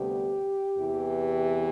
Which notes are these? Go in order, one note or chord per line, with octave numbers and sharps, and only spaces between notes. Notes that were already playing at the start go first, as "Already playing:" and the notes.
Already playing: D2 C3 G3 B3 G4
E2 C3 E3